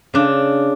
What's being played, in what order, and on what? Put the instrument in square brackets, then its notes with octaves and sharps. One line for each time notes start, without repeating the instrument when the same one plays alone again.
[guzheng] C#3 D4